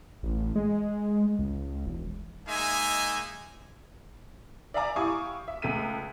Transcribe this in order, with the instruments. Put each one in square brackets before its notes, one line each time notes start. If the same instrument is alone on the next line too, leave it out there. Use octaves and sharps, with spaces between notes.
[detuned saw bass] A1
G#3
C#2
E1
[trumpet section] G#3 A#3 D#4 E5 G#5
[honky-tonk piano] D5 E5 F5 G#5 A#5 D6
E4 G4 F5 G#5 C#6 D#6
E5
C#2 A3 B6 D#7